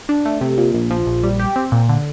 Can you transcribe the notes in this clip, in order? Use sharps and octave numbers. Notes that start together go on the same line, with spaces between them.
D4
A3
C3
A#2
A#1
F3
A#1
G3
G4
C4
A#2
D3